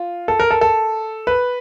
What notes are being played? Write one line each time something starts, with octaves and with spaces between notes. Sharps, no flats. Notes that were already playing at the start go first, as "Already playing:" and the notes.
Already playing: F4
A4
A#4
A4
A4
B4